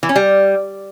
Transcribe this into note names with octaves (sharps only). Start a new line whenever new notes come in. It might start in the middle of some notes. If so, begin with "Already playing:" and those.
E3
C#4
G3